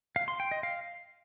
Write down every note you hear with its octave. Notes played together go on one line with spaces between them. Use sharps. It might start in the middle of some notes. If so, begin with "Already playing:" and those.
F5
C6
G5
D#5
F5